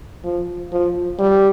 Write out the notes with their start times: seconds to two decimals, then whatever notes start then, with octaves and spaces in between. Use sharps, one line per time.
0.24 F3
0.72 F3
1.20 G3